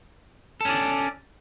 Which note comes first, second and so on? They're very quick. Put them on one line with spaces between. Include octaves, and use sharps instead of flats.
A4 C#4 D5